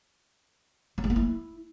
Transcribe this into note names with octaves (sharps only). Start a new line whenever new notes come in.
F#3
G#3
A#3
E4